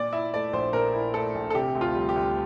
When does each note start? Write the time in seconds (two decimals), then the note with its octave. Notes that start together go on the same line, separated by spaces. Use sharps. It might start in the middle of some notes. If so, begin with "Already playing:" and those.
Already playing: A#2 D5
0.13 E4 E5
0.34 A3 D5
0.53 A#1 C5
0.73 A#2 A#4
0.93 E4
1.14 A3 A4
1.35 A#1
1.50 A4
1.54 C3 G4
1.75 D2
1.81 F4
1.95 G3
2.09 G4
2.16 D2